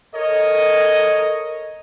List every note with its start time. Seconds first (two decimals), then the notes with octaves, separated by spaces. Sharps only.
0.15 A4 A#4 C#5 D#5